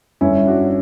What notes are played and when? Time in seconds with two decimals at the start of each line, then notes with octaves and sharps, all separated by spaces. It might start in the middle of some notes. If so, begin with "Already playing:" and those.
0.21 G1 G2 D3 C#4 E4
0.47 D4 F#4